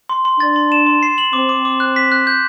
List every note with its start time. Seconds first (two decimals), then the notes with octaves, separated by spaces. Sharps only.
0.09 C6
0.25 C6
0.40 D4 A6
0.56 C6
0.72 E7
0.86 C6
1.03 C7
1.18 F#7
1.33 C4 D6
1.49 D6
1.65 D6
1.80 F#6
1.96 B6
2.12 F#6
2.27 G6